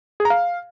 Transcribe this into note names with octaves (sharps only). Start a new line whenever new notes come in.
G#4
A#5
F5